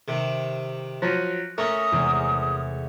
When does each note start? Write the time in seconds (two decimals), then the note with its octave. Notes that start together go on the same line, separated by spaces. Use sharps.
0.08 C3 D#3
1.02 F3 F#3 F#6 C#7 D#7
1.58 A3 C#4 A#4 C#6 D#6
1.92 E2 C3 G#3